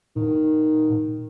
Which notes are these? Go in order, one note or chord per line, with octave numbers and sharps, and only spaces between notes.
A#2 D#3